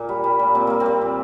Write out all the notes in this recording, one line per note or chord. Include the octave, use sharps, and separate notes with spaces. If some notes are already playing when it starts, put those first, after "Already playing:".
Already playing: A#2 A#3
G3
G3
A#2
A#2 C4
G3 A#3
C4
G3
A#2